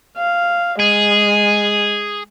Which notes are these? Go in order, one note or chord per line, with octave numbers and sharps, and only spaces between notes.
F5
G#3 G#4